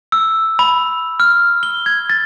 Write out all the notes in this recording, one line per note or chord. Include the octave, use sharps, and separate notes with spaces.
E6
B5
F6
G7
G#6
A6